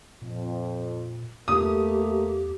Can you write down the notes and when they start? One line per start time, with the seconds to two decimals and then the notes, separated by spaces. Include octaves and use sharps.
0.21 F2 A#2
1.48 E2 A3 A#3 G4 D#6